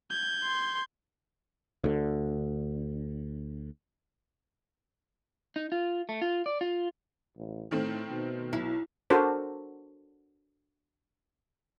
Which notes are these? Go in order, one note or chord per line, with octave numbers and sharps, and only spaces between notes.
G6 G#6
C6
D2 D3
D#4
F4
A3
F4
D5
F4
A1
A2 D#3 A3 C4
B2
B1 E4
D4 F#4 A4 A#4 C5